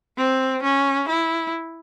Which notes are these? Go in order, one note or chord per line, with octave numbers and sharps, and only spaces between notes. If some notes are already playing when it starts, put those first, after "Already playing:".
C4
C#4
E4